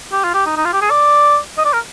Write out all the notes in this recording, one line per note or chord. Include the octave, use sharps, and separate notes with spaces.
G4
F4
G4
D#4
D#4
F4
G4
G#4
D5
D#5
D5
A#4